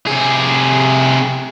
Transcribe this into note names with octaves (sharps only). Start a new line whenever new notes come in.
C3 G#4